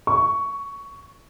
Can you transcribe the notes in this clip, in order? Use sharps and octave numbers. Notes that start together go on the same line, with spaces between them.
C#6